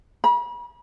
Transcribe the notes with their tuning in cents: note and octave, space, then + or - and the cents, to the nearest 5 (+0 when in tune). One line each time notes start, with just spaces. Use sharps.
B5 -40